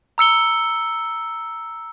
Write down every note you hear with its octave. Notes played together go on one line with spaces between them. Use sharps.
A#5 E6 C#7 G7